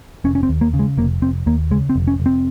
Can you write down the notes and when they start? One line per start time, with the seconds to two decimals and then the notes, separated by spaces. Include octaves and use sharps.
0.24 F1 C#4
0.35 C#4
0.43 C4
0.49 D#2
0.61 A#3
0.74 C#3
0.79 G#3
0.97 F1 A#3
1.22 F1 C4
1.46 D#2 A#3
1.71 C#3 G#3
1.90 C4
1.96 F1
2.08 C#4
2.20 F1
2.26 C4